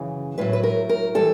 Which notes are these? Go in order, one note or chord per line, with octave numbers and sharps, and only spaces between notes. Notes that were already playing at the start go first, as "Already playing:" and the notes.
Already playing: F#2 C#3 E3
A2 F#3 B4
B4
A#4
A#4
E3 G3 A4